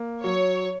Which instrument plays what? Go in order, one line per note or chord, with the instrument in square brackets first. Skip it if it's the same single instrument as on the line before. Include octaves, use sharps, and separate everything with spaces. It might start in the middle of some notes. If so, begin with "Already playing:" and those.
Already playing: [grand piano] A#3
[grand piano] F#3 [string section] C#5